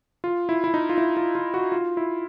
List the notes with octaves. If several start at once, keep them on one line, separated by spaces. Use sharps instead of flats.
F4
E4
E4
D#4
F4
E4
F4
F4
F#4
F4
E4